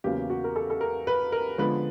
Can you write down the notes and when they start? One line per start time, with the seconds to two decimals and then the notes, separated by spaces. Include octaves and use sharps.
0.04 E2 C#3 F#3 A#3 C#4 G4
0.30 F#4
0.44 A#4
0.56 A4
0.70 A4
0.81 A#4
1.07 B4
1.32 A#4
1.58 D3 F3 G#3 B3 B4